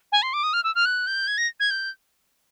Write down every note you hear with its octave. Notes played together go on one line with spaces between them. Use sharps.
G#5
C6
D6
D#6
F6
E6
F6
F#6
G6
G#6
A#6
G#6
G6